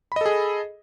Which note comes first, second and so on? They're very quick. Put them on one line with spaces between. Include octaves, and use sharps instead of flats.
B5 D#5 A4 G#4